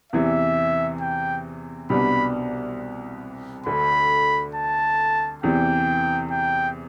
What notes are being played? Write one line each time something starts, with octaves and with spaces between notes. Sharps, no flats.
E2 C3 E3 E5
G5
C2 B2 G3 B3 D4 B5
D2 D3 A3 B5
A5
E2 C3 E3 G5
G5